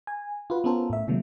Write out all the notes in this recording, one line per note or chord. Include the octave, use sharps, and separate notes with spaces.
G#5
F4 F#4 B4
B3 C#4 F4 A4 A#4 C5
A2 E5
C3 D#3 F3 F#3 G#3 A#3